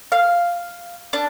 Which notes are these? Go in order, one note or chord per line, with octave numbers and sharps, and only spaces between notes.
F5
D4